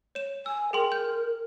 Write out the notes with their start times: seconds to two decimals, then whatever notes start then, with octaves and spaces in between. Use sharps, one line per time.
0.15 C#5 E7
0.46 G#5 E6
0.73 G#4 A#4 G5 C6
0.92 G6